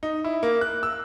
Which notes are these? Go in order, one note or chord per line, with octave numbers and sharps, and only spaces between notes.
D#4
E4
A#3
F#6
E6